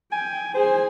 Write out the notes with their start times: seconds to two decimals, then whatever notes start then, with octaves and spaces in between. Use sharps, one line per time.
0.12 G5 G#5
0.55 G#4 C5 G#5